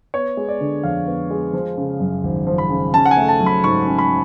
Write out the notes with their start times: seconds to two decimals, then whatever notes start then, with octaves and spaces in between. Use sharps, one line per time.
0.14 B3 C#5
0.37 G#3
0.49 D5
0.61 D3
0.84 F2 F5
1.07 B3
1.31 G#3
1.53 F3
1.78 C#3
2.00 F#2
2.24 G#1
2.47 F3
2.58 B5
2.70 C#3
2.94 C#4 A5
3.05 F#5
3.11 G#5
3.17 A3
3.29 A5
3.40 F#3
3.46 B5
3.64 G#2 C#6
3.87 C#4
3.98 B5